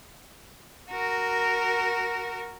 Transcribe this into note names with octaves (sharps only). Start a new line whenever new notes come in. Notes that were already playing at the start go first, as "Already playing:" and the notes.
F#4 A#4